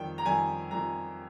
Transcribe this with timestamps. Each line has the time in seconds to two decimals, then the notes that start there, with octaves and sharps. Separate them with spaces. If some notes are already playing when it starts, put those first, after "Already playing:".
Already playing: F2 D#3 G3 G5
0.18 A#5
0.26 F2 D#3 G3 G#5
0.71 F2 D#3 G3 A#5